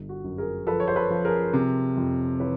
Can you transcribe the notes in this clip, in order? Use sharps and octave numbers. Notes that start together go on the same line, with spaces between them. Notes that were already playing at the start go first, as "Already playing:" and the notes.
Already playing: G1
F#4
F#2
G#4 A#4
F3 A4 B4
C#5
C5
A4 B4
F3
G#4 A#4
C3
F2
E3 B4 C#5